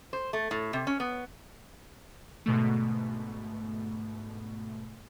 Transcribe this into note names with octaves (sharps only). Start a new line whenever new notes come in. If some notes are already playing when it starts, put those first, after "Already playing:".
C5
A3
A2
C3
C#4
B3
G#2 B2 D3 A3